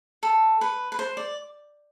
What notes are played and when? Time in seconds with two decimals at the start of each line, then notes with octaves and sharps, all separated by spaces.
0.23 A4
0.61 B4
0.92 B4
0.99 C5
1.17 D5